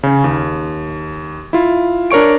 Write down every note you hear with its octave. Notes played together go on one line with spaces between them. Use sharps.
C#3 C#4
D#2
E4 F4
D4 A#4 C#5 C#6 D7